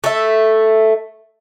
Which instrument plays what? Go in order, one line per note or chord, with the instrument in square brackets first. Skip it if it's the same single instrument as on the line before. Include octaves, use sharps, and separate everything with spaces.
[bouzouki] A3 E5